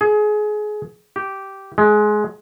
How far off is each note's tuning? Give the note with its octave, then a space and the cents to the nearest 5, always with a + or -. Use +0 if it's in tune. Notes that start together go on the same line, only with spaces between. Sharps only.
G#4 +25
G4 -10
G#3 +20